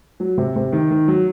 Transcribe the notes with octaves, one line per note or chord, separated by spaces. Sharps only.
F#3
C3
C3
D#3
D#3
F#3